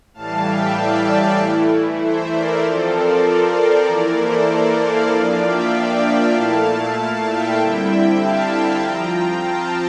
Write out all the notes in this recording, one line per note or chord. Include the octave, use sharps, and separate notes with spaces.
A2 E3 G3 F5 A5
E5 G5
D5 F5
E3 A3 E4
C5 E5
A#4 D5
F3 C4 F4 A4 C5
A#4 D5
A#4 D5
E3 A#3 E4
A4 C5
A#4 D5
D5 F5
F3 A#3 D4 F4
E5 G5
A#2 A3 E4 F5 A5
F5 A5
F5 A5
E5 G5
D3 G3 C4 E4
F5 A5
F5 A5
F3 C4 F4 G5 A#5
F5 A5